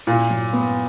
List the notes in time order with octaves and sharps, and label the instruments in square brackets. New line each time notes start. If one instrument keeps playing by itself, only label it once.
[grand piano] A#2 [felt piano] E4
[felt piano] F#3
B3